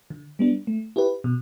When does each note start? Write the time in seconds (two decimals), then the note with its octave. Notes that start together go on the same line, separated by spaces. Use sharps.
0.10 D3
0.39 G3 B3 D4
0.67 A3
0.96 E4 G4 B4
1.24 B2